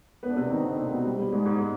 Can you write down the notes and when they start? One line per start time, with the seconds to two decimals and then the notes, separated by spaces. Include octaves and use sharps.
0.23 B3 B4
0.30 D4
0.36 C3 C4
0.50 D#3 D#4
0.64 D3 D4
0.77 C3 C4
0.91 B2 B3
1.05 G3
1.19 G3
1.32 G#2 G#3
1.46 G#2 G#3